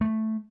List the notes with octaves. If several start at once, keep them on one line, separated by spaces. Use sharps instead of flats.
A3